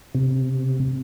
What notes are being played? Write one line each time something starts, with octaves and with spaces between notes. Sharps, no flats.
C3